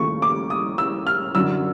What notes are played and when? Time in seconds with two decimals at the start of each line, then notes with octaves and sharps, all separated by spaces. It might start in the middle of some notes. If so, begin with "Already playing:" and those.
Already playing: D#2 C#3 F3 A3 C#6
0.22 D6
0.50 D#6
0.78 E6
1.07 F6
1.35 F#2 D3 F#3 E6